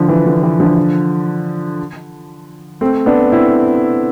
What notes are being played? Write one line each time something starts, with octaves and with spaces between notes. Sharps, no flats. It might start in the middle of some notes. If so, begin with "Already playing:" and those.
Already playing: D3 F3
E3
D3
E3
D3 F3
A3 C4
B3 D4
C4 E4